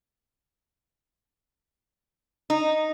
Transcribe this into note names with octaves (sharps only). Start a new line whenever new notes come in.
D#4